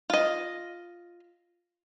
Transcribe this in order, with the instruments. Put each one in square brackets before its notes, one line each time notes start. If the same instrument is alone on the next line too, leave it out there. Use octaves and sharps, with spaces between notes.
[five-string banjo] F4 D#5